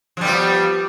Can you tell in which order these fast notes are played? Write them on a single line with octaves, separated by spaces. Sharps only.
F3 G3 B3